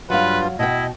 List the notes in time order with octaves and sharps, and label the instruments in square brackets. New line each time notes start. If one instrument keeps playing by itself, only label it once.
[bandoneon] G2 F4 [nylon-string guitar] F#3 F5 [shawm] B4
[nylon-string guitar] B2 F#4 G5 [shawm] E4 [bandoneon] D#5